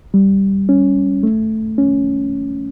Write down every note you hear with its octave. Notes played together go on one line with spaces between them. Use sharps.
G3
C#4
A3
C#4